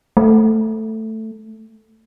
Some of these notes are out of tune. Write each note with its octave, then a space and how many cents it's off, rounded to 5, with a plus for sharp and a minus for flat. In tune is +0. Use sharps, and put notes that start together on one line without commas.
A3 +5